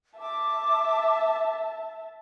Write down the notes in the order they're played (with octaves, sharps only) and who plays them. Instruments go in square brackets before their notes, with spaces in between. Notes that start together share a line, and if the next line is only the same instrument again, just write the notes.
[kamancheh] E5 A5 [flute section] D6